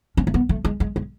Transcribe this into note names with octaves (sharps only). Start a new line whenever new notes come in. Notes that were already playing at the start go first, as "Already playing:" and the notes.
C#4
A3
B3
A3
G#3
G#3
G#3